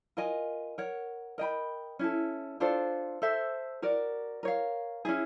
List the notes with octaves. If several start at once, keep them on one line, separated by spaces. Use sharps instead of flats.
F4 A#4 D#5 G#5
A#4 C#5 F#5
A#4 D#5 G5 B5
C#4 E4 A4
D4 F4 A4 C5
A4 C5 E5
F#4 A#4 D5
A#4 C#5 F5
C#4 E4 G#4